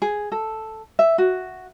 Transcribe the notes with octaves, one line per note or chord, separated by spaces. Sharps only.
G#4
A4
E5
F#4